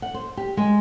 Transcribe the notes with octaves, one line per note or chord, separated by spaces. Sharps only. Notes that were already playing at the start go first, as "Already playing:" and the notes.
F#5
C5
G4
G#3